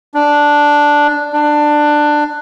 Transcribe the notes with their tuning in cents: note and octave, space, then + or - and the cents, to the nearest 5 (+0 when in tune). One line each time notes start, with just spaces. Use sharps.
D4 +0
D4 +15